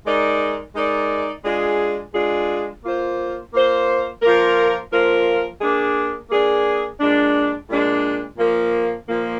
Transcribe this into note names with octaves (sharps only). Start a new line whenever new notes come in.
G#3 D#4 A#4 D5
G#3 D#4 A#4 D5
G#3 D4 F4 G#4
G#3 D4 F4 G#4
A#3 F4 C5
A#3 F4 C5
F3 A#3 F4 A#4
F3 A#3 F4 A#4
A#3 D4 G#4
A#3 D4 G#4
A#2 G#3 D4
A#2 G#3 D4
A#2 F3 A#3
A#2 F3 A#3